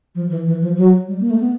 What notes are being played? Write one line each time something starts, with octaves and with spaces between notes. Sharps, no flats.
F3
E3
E3
F3
F#3
G3
A#3
A3
B3